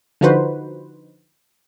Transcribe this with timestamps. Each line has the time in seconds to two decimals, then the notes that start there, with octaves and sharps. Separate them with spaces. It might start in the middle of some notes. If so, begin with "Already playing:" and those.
0.21 D3 F3 D#4 F#4 B4 C5